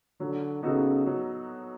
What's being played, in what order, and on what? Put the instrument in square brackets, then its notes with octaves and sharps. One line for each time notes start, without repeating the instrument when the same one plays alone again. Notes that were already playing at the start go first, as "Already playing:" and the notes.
[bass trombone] D3 [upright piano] F#3
[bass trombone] C#3 [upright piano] B3 D#4 F#4 A4
[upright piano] F#3